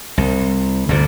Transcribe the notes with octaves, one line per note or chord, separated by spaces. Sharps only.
C2
D2 G2 A#2